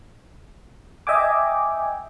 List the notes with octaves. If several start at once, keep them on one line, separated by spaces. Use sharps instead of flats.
D#5 E5 G5 G#5 D6